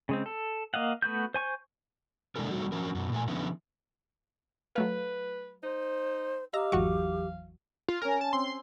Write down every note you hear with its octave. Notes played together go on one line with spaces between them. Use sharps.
C#3 G#3 C4
A4
A#3 D#5 F5 F#5
A3 B3 F#4 G6
C5 G#5 C#6 G6
C3 G#3 D4 E4 A4 A#4
G3 A3 C4 D#4 F#4
F3 F#3 C#4 A#4
F#2 B2
A#2 A3 A4 G#5
D3 F3 B3 C#4 E4
F#3 A3 B4 F5
D#4 C5
G4 D#5 F5 A#5 E6
G#1 E2 E3 F#3 F#4 C#6
F4
C#4 A#4 G#5
A5
C4 C6